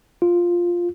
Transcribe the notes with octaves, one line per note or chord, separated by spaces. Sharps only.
F4